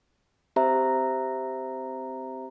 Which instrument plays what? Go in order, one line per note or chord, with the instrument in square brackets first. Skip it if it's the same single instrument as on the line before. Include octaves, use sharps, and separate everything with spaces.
[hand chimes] C4 G4 C5 E5 A#5